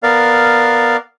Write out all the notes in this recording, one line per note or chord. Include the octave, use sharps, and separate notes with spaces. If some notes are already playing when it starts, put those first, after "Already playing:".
B3 A#4 D5 F5